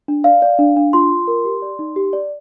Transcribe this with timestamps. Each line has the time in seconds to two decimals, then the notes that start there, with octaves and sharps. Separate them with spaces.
0.08 D4
0.24 D5 F5
0.42 D5
0.59 D4
0.76 D4
0.93 F4 C6
1.11 F4
1.28 A#4
1.45 G4
1.62 D5
1.79 D#4
1.96 G4
2.13 D5